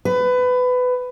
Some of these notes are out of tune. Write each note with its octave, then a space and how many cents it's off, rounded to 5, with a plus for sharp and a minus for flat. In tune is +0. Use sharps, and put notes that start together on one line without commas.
B4 +20